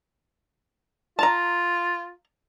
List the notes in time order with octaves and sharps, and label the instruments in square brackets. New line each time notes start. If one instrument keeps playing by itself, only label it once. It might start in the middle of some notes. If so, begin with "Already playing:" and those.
[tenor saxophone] F4 [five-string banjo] A5 A#5